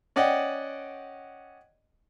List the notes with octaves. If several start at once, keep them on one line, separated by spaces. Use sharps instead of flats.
C#4 D5 D#5 F#5 G5